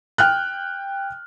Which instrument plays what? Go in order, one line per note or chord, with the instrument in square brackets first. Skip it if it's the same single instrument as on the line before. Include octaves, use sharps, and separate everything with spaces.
[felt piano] G5 F6 F#6